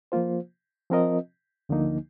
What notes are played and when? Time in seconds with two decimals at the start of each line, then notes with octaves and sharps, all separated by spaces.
0.12 F3 A#3 F4 C5
0.90 F3 C4 F4 A#4 D#5
1.69 D2 D3 F3 A#3 D#4